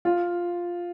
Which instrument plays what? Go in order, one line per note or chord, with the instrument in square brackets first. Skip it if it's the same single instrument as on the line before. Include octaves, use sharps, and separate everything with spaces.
[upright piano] F4